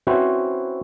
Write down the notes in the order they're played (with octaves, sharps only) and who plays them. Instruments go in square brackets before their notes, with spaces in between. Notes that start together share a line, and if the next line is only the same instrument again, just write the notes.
[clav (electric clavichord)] C4 C#4 E4 F#4 B4 C5